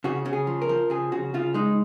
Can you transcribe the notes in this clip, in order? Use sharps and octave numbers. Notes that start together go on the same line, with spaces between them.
C#3 F#4
C#3
G#4
F3
A#4
F3
C#3 G#4
C#3 F#4
C#3 F4
G#3 D#4